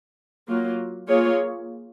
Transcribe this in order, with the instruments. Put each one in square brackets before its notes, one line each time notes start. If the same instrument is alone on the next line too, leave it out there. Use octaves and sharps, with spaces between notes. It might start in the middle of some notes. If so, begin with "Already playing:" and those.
[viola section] F#3 A#3 F4
A#3 F4 G#4 C#5